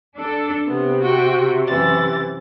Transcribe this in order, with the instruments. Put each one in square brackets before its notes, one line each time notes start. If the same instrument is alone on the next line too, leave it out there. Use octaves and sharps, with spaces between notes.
[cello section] D4 A4
[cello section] C3 [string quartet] B3
[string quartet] F#4 G5 C#6
F#2 E3 A6